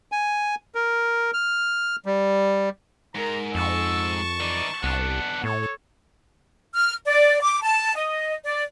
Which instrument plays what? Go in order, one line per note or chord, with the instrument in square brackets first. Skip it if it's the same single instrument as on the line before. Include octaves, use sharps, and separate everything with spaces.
[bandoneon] G#5
A#4
F6
G3
[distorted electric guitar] G#2 [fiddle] A#4 [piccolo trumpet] A#5
[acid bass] F2 [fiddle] A5 C#6 [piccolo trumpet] E6
[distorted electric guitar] E3 D#4 [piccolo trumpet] D5
[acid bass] C2 [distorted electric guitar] B3 D4 [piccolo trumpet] F#5
[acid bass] A2 [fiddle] A4 [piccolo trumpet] C#5
[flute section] F6
D5
D6
A5
D#5
D5